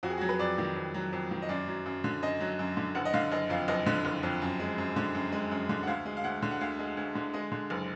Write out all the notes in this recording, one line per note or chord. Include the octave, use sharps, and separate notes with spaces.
F2 F#4
G#4
F#3 F#4
B4
F2 D5
D#3
F2
F#3
F2
D#3
D#5
F#2 D5
F#3
F#2
D3
F#2 D#5
F#3
F#2
D3
F#1 F#5
D#5
D3 F5
F#1 D#5
F2 F5
F#1 D#5
D3
F#1
F2
F#2
G#3
F#2
D3
F#2
G#3
F#2
D3
F#5
D2 F5
G#3
F5
D2 F#5
D3
F#5
D2 F5
G#3
D2
D3
G#3 D#5
D3
F#1